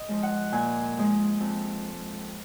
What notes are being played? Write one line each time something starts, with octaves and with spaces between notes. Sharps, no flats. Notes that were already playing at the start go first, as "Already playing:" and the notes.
Already playing: D#5
F3 G#3
F#5
A#2 G#5
F3 G#3
F2